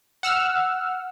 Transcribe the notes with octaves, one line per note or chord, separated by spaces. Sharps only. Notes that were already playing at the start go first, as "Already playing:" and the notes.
F#5 E6 F6